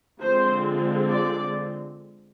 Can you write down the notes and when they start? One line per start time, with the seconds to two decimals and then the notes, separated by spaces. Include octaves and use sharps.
0.20 D3 F3 G#3 C4 C5
1.11 D5